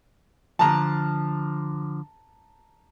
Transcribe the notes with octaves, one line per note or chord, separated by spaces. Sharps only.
D3 F3 A5 A#5